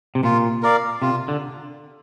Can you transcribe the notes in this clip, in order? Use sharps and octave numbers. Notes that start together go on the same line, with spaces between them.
C3
A#2 F4
A#4 D5 F5
C3 F4
D3